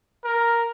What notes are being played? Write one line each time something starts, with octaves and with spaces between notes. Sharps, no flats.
A#4